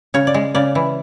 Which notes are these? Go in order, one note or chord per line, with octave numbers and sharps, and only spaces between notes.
C#3 C#5
D5
G#3
C#3 D5
E3